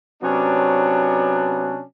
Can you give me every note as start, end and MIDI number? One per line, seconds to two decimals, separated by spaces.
0.22 1.81 48
0.22 1.81 54
0.22 1.81 59
0.22 1.81 61
0.22 1.81 62